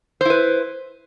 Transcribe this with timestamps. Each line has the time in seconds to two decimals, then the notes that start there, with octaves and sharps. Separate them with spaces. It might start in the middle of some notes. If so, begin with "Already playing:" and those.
0.21 C5
0.25 E4
0.30 B4